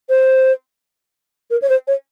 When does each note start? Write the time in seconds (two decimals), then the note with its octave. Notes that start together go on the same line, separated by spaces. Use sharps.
0.09 C5
1.50 A#4
1.62 C#5
1.69 C5
1.87 C#5